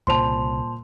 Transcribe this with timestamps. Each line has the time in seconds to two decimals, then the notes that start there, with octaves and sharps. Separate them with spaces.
0.07 C2 A#2 C#3 C5 A5 C6 F7